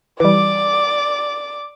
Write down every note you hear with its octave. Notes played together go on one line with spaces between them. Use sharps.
E3 G3 D5 D6